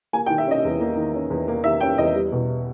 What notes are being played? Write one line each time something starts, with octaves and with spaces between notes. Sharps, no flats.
A#3 G#5
G5
D#3
E5
C#4 D#5
E2
A#3
D#3
C#4
E2
A#3
D#3 E5
C#4 G5
E2 D#5
G3
B2